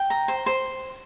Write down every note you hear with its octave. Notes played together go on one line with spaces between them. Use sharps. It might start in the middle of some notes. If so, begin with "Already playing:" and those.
Already playing: G5
A#5
C5
C5